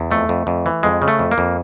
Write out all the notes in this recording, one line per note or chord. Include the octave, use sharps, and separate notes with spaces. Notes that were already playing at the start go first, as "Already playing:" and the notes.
Already playing: E2
F2 A3
F2
F2
E3
F2 G#3
C#3
A3
F2
A#3
F2